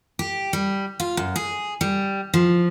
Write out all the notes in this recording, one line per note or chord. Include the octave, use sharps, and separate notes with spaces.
G4
G3
F4
F#2
G#4
G3
F3